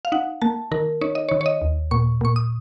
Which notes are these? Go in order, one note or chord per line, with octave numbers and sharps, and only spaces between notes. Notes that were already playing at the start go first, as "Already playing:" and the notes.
F5
D#4 F#5
A#3 A5
D#3 A#4
D#4 C#5
D#5
D#3 C#5
C#5
D#5
D#2
A#2 C#6
A#2 C#6
D#6